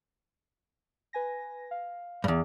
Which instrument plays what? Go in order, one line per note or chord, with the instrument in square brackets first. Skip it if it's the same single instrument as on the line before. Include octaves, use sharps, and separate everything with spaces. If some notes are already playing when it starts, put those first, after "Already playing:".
[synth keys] B4 G#5 A#6
F5
[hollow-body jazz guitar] E2 G2